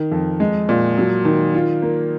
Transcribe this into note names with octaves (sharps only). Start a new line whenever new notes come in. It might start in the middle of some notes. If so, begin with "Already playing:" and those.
Already playing: D#3
F2
G#3
A#2
F#3
D#3
F4
A#3